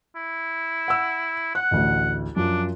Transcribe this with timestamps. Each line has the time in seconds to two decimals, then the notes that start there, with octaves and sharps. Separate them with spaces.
0.16 E4
0.88 F#5 E6
1.55 F#5 F#6
1.71 A1 D2
2.36 F#2 F3 D4